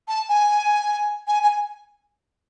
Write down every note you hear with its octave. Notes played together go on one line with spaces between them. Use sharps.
A5
G#5
G#5
G#5